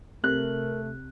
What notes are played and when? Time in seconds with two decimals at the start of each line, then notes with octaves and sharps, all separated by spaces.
0.24 C3 A3 A#4 F#6